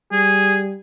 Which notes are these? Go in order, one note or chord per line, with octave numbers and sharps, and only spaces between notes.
G3 G#4